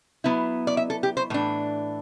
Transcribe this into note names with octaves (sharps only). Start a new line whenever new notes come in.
F#3 B3 E4
D5
E5
A4
G4
C5
A2 E3 D4